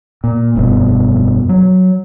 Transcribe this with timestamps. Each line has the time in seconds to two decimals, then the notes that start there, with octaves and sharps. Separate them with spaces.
0.24 A#2
0.55 F1 G2 B2
1.49 F#3